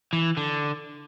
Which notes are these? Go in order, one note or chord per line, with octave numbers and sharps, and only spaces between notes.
E3
D3